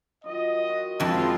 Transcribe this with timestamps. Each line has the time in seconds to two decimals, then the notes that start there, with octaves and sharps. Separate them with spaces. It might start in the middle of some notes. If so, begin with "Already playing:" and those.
0.24 D#3 F#3 F4 D#5
0.69 F#4
1.00 F2 F3 G#3 E4 F4 A5